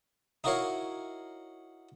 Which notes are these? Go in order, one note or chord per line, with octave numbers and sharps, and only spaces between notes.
D#4 E4 F#4 A#4 C#5 F5